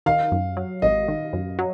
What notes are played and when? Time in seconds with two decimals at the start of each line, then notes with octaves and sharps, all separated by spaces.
0.06 D#3 F5
0.32 F#2
0.57 F#3
0.82 G#1 D#5
1.08 D#3
1.33 F#2
1.59 F#3